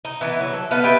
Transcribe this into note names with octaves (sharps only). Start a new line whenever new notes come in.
D#4
E3 B3
F#3
A4
B3 D#4 B4 F5
G4 B4 D#5 E5